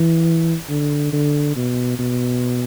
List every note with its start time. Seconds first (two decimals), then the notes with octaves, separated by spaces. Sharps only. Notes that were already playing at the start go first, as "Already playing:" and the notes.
Already playing: E3
0.69 D3
1.13 D3
1.56 B2
1.99 B2